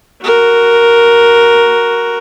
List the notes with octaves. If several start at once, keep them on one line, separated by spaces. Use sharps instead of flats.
F#4 A#4